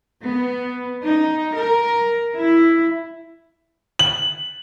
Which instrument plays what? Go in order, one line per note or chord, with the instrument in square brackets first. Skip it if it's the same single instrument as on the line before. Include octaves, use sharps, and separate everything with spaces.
[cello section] B3
D#4
A#4
E4
[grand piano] F#7